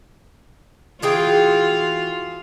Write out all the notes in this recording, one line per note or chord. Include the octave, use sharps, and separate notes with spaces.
E3 F4 F#4 G#4 G5